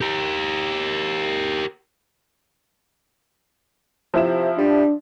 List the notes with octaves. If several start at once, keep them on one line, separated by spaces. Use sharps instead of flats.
G4 A#4
C3 F3 E4 E7
G3 D4